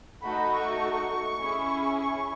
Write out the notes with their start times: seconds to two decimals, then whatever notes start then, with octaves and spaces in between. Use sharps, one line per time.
0.22 A3 D#4 F#4 A4 B5
0.52 C#6
1.40 C#4 E4 G#4
1.99 C#6